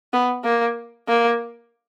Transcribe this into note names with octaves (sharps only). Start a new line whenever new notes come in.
B3
A#3
A#3